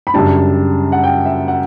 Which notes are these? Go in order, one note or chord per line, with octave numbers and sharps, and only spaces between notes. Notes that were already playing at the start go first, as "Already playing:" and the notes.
B5
F#2 C#3 G3 D4 A5
F#5
G5
E5
F#5